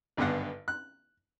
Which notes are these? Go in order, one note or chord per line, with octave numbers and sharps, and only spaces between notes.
G#1 G2 D3 B3 F#5
F#6